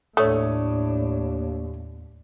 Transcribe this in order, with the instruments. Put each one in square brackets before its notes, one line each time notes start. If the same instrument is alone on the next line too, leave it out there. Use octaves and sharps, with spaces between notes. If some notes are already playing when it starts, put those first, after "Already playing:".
[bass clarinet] D#2 [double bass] A2 D4 [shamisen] A3 [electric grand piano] C#5 D#6